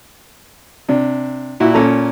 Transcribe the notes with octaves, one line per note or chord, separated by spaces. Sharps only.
C3 D4
A#2 E4 F#4
A#2 C#4 A4 A#5